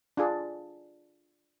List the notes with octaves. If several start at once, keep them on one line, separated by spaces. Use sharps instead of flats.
D4 F4 G#4